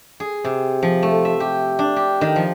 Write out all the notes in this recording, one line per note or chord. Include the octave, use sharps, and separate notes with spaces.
G#4
C3
F3
A3
E5
G4
D4
G4
D#3
F3